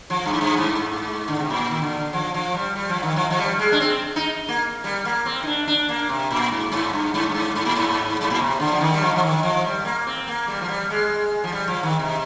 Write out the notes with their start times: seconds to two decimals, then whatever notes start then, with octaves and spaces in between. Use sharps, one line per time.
0.10 F3
0.25 G2
0.33 G#2
0.41 G2
0.56 G#2
1.28 D3
1.39 C3
1.50 A#2
1.71 D#3
1.82 D3
2.13 F3
2.34 F3
2.54 G3
2.76 G3
2.89 F3
3.03 D#3
3.16 F3
3.30 F3
3.38 G3
3.59 G#3
3.72 D4
3.80 C4
4.16 D#4
4.48 A#3
4.84 G3
5.05 A#3
5.26 C4
5.43 D#4
5.47 D4
5.68 D4
5.89 A#3
6.09 C3
6.31 A#2
6.52 G#2
6.72 G#2
6.93 G2
7.14 G#2
7.29 G2
7.34 G#2
7.55 G#2
7.65 A#2
7.75 G#2
8.21 G#2
8.30 A#2
8.40 C3
8.60 D3
8.72 F3
8.81 D#3
8.94 G3
9.02 F3
9.16 F3
9.23 D#3
9.43 F3
9.64 G3
9.85 A#3
10.07 C4
10.28 A#3
10.48 G3
10.61 F3
10.69 G3
10.90 G#3
11.44 F3
11.52 G3
11.68 F3
11.83 D#3
11.99 C3